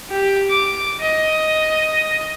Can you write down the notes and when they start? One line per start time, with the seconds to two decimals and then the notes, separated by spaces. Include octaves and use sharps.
0.10 G4
0.50 D6
1.01 D#5